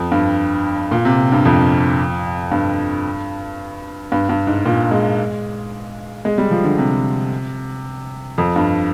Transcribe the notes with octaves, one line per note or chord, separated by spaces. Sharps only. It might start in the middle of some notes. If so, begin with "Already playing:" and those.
Already playing: F2
G2
A#2
C3
G2
F2
G2
G2
G2
G#2
A#2
G#3
G#3
G3
F3
D3
C3
F2
G2